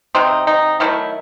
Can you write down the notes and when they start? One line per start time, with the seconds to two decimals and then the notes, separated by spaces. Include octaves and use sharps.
0.15 C3 F#3 C4 D#4
0.47 D#4
0.80 D#3 F#3 A3 E4